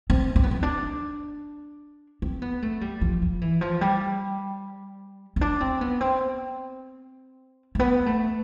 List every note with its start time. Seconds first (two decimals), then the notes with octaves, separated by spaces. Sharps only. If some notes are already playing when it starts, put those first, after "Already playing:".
0.10 C4
0.36 C4
0.44 B3
0.51 C4
0.63 D4
2.22 C4
2.42 B3
2.62 A3
2.81 G3
3.01 F3
3.22 F3
3.41 E3
3.61 F3
3.81 G3
5.36 C4
5.41 D4
5.60 C4
5.81 B3
6.01 C4
7.75 A3
7.79 B3
8.06 A3